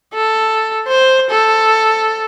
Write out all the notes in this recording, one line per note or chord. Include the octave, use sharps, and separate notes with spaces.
A4
C5
A4